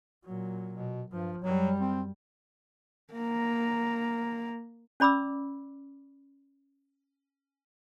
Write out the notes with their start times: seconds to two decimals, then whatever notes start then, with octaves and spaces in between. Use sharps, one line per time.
0.24 A#2 F#3
0.73 B2
1.12 G2 F3
1.42 F#2 F#3 G3
1.80 C4
3.14 A#3 A#5
5.00 C#4 D5 B5 D6 E6